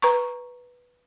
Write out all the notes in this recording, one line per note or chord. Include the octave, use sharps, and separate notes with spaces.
B4 A#5 C#6